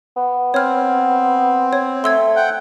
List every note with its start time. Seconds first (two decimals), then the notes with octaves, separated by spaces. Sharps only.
0.17 B3
0.54 C4 C#5 F6
1.73 C#5
2.04 A3 C6 E6 G#6
2.36 F#5 G5